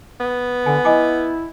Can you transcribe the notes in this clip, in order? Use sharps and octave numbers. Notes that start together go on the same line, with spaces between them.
B3
D3 G#5
E4 D#5 G#5 D6